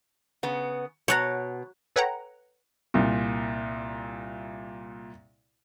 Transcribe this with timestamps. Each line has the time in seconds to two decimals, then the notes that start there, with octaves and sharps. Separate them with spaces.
0.43 C#3 B3
1.08 B2 C#5 F#5 A#5
1.96 A4 B4 C#5 F#5 G5 A#5
2.94 C2 A#2